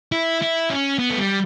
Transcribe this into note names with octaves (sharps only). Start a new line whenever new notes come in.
E4
E4
C#4
B3
A3
G3